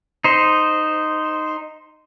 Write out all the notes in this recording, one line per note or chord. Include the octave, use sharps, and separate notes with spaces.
D#4 C5